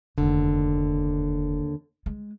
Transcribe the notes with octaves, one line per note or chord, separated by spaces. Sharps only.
F1 D#2 D3
G#3